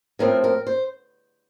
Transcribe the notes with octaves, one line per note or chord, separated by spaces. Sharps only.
A2 F3 A3 C4 A#4
A#4
C5